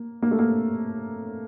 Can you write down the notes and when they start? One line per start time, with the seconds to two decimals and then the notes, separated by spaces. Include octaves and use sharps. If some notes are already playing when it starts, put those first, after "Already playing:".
Already playing: A#3
0.22 A#3
0.31 A3
0.39 A#3